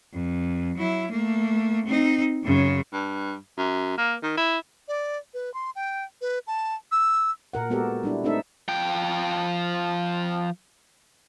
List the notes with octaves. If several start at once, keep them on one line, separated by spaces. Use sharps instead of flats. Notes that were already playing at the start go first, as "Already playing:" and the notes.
F2
F#3 E4
A3 A#3
C4 D#4
F#2 C#3
G2
F#2
A#3
D#3
E4
D5
B4
C6
G5
B4
A5
E6
A#2 A#4 F#5
G#3 B3 F#4 G4 A4 A#4
G3 D4 E4
A3 C4 D4 D#4 A4 E5
F3 G5